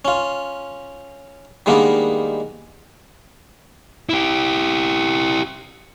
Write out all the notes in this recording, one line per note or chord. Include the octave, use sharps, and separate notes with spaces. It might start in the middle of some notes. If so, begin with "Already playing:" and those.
C#4 F4
D#3 G3 G#3 A#3 B3 D4
E4 G4